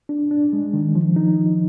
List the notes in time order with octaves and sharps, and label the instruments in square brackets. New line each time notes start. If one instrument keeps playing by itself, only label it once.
[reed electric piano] D4
D4
G#3
D#3
F3
D#4
F3